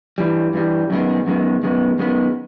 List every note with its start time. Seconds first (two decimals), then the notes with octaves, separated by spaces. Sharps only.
0.18 G2 E3 G3
0.54 G2 E3 G3
0.90 F#2 D#3 G#3 B3
1.27 F#2 D#3 G#3 B3
1.63 F#2 D#3 G#3 B3
1.99 F#2 D#3 G#3 B3